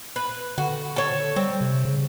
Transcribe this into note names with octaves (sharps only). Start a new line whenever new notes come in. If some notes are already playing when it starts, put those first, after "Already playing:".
B4
D3 F#4
A4 C#5
G3 C4
C3
C#3